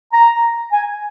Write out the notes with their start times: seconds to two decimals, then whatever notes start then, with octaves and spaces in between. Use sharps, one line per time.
0.13 A#5
0.72 G#5